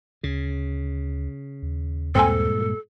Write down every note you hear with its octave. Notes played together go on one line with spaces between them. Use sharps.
D2 C#3
D#2
G2 A#2 G#3 C4 A4 G#5